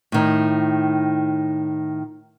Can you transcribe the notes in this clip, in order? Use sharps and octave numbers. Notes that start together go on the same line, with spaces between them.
A2 D#3